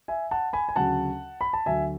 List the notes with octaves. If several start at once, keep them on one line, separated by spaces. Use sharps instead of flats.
E5 G#5
F#5 A5
G#5 B5
G#5
D2 C#3 F#3 F#5 A5
B5
A5
D2 D3 F#3 E5 G#5